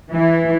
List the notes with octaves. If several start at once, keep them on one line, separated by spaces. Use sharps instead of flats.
E3